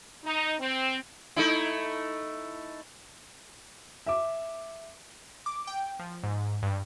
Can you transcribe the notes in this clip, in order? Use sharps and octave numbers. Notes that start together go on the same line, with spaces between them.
D#4
C4
A3 D#4 E4
E5 D6
D6
G5
F3
G#2
G2